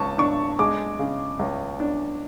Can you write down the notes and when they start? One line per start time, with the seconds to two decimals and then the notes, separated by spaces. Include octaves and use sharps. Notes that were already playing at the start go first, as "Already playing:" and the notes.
Already playing: C#2 A5 C#6
0.18 D4 C#6
0.59 G#3 D6
0.99 C#3
1.39 C#2
1.80 D4